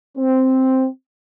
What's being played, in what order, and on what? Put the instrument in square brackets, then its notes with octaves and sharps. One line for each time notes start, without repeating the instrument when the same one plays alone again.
[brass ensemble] C4